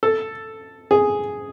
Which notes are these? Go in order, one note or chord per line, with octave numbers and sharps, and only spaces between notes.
A4
G#4